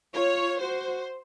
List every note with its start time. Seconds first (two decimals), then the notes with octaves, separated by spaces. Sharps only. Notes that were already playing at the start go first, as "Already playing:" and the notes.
0.14 F4 C#5
0.60 F#4 C5